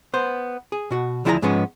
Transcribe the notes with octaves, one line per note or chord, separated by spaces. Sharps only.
B3 C5
G#4
B2 F#4
D2 F3 E4 G#4 F5 A#5
G#2 F3 G#3 B3 C#4